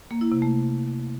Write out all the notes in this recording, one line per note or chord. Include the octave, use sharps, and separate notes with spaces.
A#3
E4
C3
A3